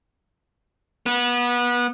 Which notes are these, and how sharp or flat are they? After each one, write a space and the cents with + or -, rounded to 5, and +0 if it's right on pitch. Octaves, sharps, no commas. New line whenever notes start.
B3 -25